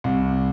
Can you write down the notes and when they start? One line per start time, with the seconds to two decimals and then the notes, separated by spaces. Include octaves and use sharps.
0.04 C2